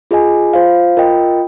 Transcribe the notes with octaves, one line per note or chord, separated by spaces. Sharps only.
F4 G#4 D#5 G#5
F4 C5 F5
F4 A#4 D#5 G5